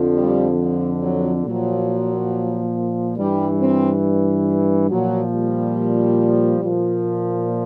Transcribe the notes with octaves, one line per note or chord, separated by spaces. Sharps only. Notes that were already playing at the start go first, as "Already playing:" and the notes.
Already playing: F2 D3 F3
G3
F3
F#3
A#2 F3 F#3
G2 E3 G3
C4
A#2 F3 F#3
G3
A#2 F3